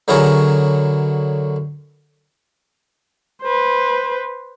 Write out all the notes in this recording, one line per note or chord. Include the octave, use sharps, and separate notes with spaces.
D3 F#3 E4 G#4 A#4 C#5
B4 C5